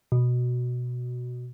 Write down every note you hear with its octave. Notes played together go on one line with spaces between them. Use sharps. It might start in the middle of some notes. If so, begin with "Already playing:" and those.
B2